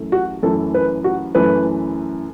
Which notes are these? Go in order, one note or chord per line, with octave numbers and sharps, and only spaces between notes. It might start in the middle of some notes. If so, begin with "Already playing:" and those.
Already playing: F#2 E3 A3
F#4
F#2 E3 A3 A4
B4
F#4
F#2 E3 A3 B4